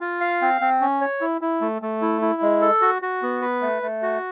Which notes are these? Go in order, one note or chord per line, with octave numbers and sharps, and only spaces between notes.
F4
F5
C4
C4
C#4
C#5
E4
E4
A3
A3
E4
E4
G#3
A4
F#4
F#4
B3
B4
A3
A3
F#4